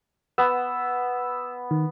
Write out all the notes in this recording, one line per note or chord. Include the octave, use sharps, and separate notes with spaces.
B3 E6
D#3